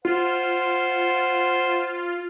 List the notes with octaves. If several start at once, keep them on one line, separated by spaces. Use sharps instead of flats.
F4 C5 F#5